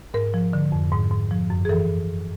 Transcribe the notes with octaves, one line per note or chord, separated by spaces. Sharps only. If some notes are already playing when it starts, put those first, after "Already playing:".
G#2 A#4
F3
D3
F2
G#2
G#2
F3
F#2
G#4
E3 A4